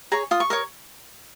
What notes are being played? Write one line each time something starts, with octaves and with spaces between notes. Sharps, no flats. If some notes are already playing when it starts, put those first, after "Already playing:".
G#4 C#5 A#5
F4 D#6
C#6
A#4 C#5 D#6